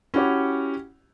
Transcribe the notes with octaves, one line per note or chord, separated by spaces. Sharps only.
C#4 E4 F#4 G4 C#5